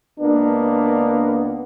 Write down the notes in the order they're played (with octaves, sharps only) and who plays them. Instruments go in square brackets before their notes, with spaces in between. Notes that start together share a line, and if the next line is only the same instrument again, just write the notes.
[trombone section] C#2 A#3 B3 [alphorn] D4